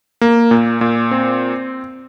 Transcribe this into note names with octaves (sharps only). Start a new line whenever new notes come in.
A#3
A#2
A#2
C4